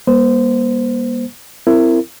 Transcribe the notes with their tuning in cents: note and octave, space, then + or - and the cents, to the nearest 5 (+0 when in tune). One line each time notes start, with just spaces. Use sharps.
G3 +40 A#3 +45 C5 -15
C4 -10 E4 +20 A#4 -30